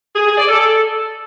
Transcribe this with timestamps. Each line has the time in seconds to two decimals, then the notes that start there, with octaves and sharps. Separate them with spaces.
0.16 G#4
0.27 G#4
0.38 D5
0.49 A4